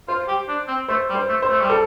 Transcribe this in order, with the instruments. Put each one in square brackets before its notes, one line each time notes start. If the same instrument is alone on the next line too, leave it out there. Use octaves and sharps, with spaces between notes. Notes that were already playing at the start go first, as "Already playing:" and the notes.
[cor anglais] F4 [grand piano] C5
[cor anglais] G4
D4
C4
[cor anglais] A3 [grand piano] C5
[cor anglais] G3
[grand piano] C5
[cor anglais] A3
[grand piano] C5
[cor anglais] A3
G3
[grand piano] A4